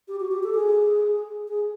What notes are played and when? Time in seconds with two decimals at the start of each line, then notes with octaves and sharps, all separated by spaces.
0.08 G4
0.20 F#4
0.31 G4
0.43 A4
0.54 G#4
1.48 G#4